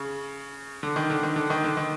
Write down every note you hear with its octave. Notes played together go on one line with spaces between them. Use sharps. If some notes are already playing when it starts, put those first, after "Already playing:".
Already playing: C#3
D3
D#3
D3
D#3
D3
D#3
D3
D#3